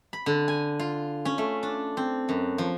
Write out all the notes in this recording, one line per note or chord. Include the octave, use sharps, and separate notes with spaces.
B5
D3
G#5
F4
C#4
A3
D4
C4
F#2
F3